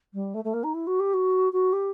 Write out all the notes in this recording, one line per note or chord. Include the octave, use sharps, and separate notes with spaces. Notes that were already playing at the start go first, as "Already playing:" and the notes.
G3
A3
A3
A#3
D#4
E4
F#4
G4
F#4
F#4
G4